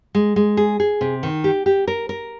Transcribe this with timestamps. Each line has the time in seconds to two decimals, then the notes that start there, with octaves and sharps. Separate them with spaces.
0.15 G#3
0.36 G#3
0.57 G#4
0.80 G#4
1.01 C3
1.23 D#3
1.44 G4
1.66 G4
1.87 A#4
2.09 A#4